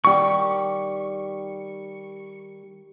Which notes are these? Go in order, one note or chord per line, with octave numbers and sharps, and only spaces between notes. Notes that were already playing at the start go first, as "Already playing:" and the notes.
D#3 G3 G4 C#6